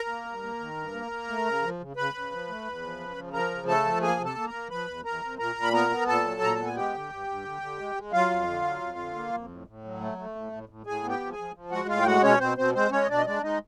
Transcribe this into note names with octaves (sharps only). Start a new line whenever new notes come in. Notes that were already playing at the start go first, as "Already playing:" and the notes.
Already playing: A#4 A#5
A#3
G2
A#3
D#3
G2
A#3
A#3
A3
C#3
F3
C#3
C#3 B4 B5
C#3
F3
A3
E2
F3
C#3
F3
F3 A#4 A#5
C#3
A3 A4 A5
F3
A#3 G#4 G#5
C3
A4 A5
A#3
A#4 A#5
A#3
F3 B4 B5
E2
E2 A#4 A#5
C3
A#2 A#4 A#5
A#2
B5
B3 A#4 A#5
B3
A#2 A4 A5
F#3
A#2 A#5
B3 A5
G#5
G#3 G4 G5
D3
G2
G2
D3
D3
G#3
G#3
F#3 F4 F5
F2
D3
F#3
F2
D3
A#3
F2
A2
A2
F#3
A3
A3
A2
A2
A2
A2 G#4 G#5
B3
G4 G5
F3
G#4 G#5
F3
F3
G#3 F#4 F#5
A2 F4 F5
G5
G#3 F#4 F#5
B2 C#4 C#5
B2 C4 C5
B2 C4 C5
G#3 C4 C5
G#3 C#4 C#5
D#5
B2 D4 D5
D#5
G#3 D4 D5
G#3 D#4 D#5